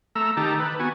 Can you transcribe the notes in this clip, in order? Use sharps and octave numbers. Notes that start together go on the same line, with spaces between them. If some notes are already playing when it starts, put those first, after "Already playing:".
A3 A#5 E6
D#3 D#4 G4 A5 A#5
B4
B3 F#4 G#5